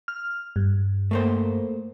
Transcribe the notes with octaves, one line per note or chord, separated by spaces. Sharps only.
F6
G2
A3 A#3 C5